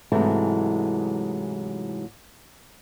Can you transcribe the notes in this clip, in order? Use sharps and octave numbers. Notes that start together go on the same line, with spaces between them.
G#2 C3 E3 F#3 G#3 A3